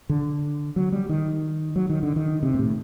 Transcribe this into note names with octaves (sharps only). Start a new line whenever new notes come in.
D3
F#3
G3
D#3
F#3
D#3
D3
D#3
C3
A#2
A2